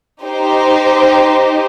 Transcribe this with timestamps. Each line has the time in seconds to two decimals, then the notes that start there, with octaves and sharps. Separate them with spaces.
0.22 D#4 G4 C5